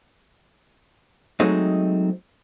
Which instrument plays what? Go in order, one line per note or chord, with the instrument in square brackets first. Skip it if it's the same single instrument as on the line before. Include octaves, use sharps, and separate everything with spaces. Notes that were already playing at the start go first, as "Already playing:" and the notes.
[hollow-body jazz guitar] F#3 G#3 A3 C4 D#4